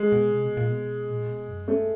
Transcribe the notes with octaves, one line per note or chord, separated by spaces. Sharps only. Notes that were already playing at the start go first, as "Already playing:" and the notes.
Already playing: G#3
B2
C3
B2
A#2
B2
A#2
B2
F#2
G2 A3